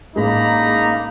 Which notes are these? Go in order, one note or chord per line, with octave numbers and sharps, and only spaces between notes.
A1 G#3 A#3 D4 D#4 A#5 B5